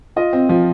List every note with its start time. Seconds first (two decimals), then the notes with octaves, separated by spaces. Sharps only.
0.16 F4 D#5
0.33 C4
0.49 F3